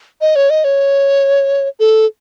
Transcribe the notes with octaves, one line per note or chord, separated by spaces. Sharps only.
D#5
C#5
D#5
C#5
A4